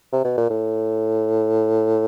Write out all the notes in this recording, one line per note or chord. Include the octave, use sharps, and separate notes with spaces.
C3
B2
A#2
A2